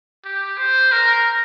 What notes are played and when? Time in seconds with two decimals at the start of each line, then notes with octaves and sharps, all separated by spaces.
0.24 G4
0.58 C5
0.92 A#4